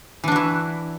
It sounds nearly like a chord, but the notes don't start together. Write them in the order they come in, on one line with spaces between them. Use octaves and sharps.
E3 D4 F#4 E4